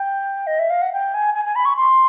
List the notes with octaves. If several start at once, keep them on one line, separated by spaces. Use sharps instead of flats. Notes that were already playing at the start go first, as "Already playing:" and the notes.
Already playing: G5
D#5
E5
F5
F#5
G5
G#5
G#5
G#5
B5
C#6
C6